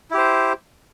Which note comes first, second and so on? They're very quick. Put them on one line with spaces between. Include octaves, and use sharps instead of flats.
E4 G4 C5